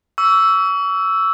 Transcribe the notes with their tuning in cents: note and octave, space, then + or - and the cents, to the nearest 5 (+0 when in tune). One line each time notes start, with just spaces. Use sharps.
C#6 +40 E6 +0